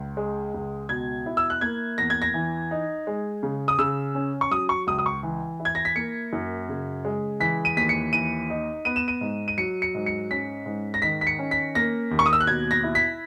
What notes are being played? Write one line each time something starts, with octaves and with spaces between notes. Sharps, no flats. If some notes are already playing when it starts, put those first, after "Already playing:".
Already playing: C#2
G#3
C#2
B2 G#6
E4
E6
F#6
A#3 G#6
E2 A#6
G#6
A#6
E3
D#4
G#3
C#3
D#6
C#3 E6
C#4
C#6
F#3 D#6
C#6
C#2 D#6
D#6
C#6
E3
E4
G#6
A#6
B6
A#3 C#7
F#2
C#3
G#3
E3 B6
D#7
D#2 B6
C#7
E3 D#7
D#4
B3 D#7
E7
D#7
G#2
D#7
F#3 C#7
C#7
G#2
C#7
C#4 B6
G#2
A#6
D#3 B6
B6
C#7
C#4
B6
A#3 A#6
D#2
C#6
D#6
E6
F#6
B2 G#6
A#6
E4
B6